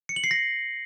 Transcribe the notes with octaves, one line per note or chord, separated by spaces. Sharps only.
C#7
F#7
C7
A#6